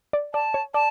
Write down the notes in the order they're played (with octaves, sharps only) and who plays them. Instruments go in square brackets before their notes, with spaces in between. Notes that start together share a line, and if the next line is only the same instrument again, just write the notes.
[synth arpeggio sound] D5
[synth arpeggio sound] D5 [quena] A5
[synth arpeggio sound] C#5
[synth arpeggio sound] D5 [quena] A5